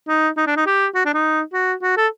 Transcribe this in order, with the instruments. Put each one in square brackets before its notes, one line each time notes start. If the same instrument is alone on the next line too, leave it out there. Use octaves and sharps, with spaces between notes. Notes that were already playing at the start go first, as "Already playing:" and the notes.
[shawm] D#4
D#4
D4
D#4
G4
F#4
D4
D#4
F#4
F#4
A4